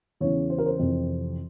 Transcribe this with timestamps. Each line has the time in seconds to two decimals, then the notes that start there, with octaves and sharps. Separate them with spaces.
0.20 E2 C#3 E3 C#5
0.50 C5
0.58 A#4
0.66 C5
0.79 F2 C3 E3